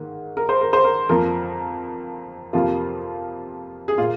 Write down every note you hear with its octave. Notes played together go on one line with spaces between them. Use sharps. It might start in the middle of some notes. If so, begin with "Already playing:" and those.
Already playing: G#2 D#3 A#3
A#4
C5
A#4
C5
A#4
F2 F3 A#3 A#4
F2 C3 F3 A#3 F4
G#4
A#2 A#3 F4